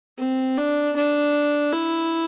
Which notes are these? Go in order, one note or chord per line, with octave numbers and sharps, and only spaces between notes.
C4
D4
D4
E4